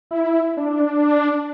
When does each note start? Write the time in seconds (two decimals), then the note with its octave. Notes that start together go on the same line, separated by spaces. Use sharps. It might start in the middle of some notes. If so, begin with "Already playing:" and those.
0.11 E4
0.57 D4